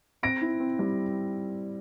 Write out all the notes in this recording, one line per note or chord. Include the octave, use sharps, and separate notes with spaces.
C4 A#6 D7
E4
C4
G3